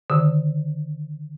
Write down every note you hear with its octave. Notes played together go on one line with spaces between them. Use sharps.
D3 D#3